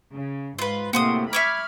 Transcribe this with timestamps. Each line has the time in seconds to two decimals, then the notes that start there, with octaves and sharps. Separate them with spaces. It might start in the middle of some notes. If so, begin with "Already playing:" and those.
0.13 C#3
0.59 G#2 F4 B4
0.93 A2 C3 A#3 F#4 C5 D#6
1.33 E5 B5 C#6 D6 F6 G#6